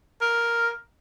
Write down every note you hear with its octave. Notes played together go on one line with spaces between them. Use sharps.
A#4